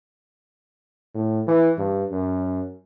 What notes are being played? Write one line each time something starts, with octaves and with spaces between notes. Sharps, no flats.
A2
E3
G2
F#2